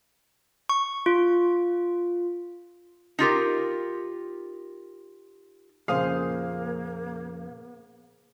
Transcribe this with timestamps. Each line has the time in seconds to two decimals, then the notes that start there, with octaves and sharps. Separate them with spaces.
0.69 C#6
1.06 F4
3.19 D#4 F4 G4 A#4
5.88 F2 A#2 C#3 A#3 G#4 C5 F5 D#6